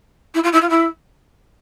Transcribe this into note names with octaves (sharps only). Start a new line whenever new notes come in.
E4
F4
E4
F4
E4